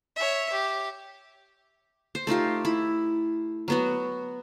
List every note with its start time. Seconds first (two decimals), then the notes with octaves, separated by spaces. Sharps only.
0.16 C#5 E5
0.53 G4
2.15 C5
2.27 A3 D#4 F4 G4
2.65 E4
3.68 F#3 B3 F#4